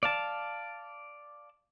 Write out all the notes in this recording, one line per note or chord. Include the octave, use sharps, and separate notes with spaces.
D5 F5 A5